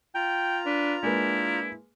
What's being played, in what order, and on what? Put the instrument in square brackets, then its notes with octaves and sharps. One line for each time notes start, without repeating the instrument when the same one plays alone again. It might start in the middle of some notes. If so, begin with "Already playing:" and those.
[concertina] F4 A#5 [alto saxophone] G5
[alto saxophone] D4 [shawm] B4
[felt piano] G#3 A#3 B4 [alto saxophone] D4 [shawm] E4